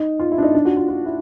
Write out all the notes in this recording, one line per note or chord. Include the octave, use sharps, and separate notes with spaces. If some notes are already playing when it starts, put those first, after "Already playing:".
Already playing: D#4
F4
E4
D4
D#4
D4
F#4
F4
F4
E4